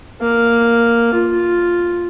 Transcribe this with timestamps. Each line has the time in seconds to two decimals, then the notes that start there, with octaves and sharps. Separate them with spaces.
0.21 A#3 F5
1.13 F4